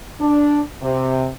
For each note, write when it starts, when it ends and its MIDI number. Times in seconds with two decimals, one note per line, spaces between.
0.21 0.60 62
0.83 1.29 48